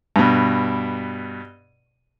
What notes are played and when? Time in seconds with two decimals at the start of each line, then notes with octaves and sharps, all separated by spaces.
0.16 G2 B2